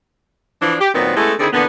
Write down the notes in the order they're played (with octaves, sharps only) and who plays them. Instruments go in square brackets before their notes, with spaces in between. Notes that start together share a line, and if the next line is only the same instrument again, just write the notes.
[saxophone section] E3 F3 D4
G4
A#2 D#3 F#3 B3 C4
G#3 A3 B3 C#4 E4 A4
D3 D#3 C4 E4 G#4
A#2 D3 E3 B3